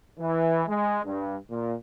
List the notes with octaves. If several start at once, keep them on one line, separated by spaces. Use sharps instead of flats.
E3
G#3
G2
A#2